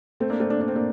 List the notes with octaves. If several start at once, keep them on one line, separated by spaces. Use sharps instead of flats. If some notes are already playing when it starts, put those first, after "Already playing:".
A3 C4
A#3 D4
A3 C4
A#3 D4
D4
C4
A#3 D4